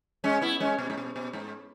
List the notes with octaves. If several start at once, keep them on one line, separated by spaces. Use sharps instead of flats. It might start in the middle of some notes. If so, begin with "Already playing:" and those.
G#3 C#4
B3 E4
G#3 C#4
B2
G#2
B2
B2
G#2